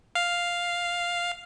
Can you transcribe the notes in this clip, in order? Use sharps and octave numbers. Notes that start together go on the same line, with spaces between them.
F5